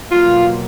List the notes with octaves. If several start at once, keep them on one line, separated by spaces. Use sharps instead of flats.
B2 F#3 A#3 F4